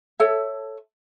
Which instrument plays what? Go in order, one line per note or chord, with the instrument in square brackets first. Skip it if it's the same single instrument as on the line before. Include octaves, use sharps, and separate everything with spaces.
[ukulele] A4 C#5 E5